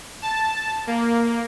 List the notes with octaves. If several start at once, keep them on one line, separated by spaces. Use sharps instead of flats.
A5
A#3